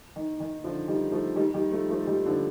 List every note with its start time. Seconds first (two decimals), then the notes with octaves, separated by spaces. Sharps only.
0.16 D#3
0.40 D#3
0.64 D3 F3
0.88 D#3 G3
1.12 F3 A3
1.36 D#3 G3
1.54 D#3 G3
1.71 F3 A3
1.89 F3 A3
2.07 D#3 G3
2.25 D3 F3